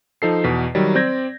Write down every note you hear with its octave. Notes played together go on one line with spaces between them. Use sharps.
F3 D#4 A4 C7
E2 B2 B6
D#3 F#3 G3
C4 D5 G6 G#6 A#6